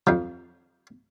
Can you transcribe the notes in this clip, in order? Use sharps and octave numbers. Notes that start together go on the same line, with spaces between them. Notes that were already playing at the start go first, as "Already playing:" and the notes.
F2 F3